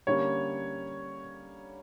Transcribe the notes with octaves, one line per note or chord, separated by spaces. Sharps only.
D3 G3 A#3 C#4 C#5